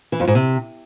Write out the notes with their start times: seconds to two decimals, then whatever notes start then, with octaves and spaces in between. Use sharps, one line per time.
0.12 E3
0.20 F2
0.27 G#2
0.35 C3